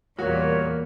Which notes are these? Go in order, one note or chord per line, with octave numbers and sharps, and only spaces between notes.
E2 A#2 G3 A#3 F#4 A#4 C#5